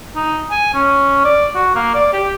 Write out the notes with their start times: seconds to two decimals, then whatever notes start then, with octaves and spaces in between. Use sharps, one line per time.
0.16 D#4
0.51 G#5
0.74 C#4
1.25 D5
1.55 F#4
1.75 A#3
1.94 D5
2.13 G4